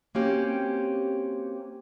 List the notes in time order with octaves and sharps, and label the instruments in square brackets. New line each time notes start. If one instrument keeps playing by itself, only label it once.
[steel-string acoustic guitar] A#3 C4 C#4 F#4 G4